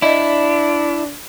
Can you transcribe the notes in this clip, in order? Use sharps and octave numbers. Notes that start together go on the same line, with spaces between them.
D4 E4 D5 D#5